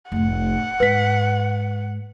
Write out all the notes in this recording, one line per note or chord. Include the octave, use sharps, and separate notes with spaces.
F1 A2 F#5
G#2 B4 B6